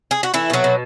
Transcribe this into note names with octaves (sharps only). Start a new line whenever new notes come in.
G#4
F#4
E3 A3 E4
B2 F#3 F#4
B2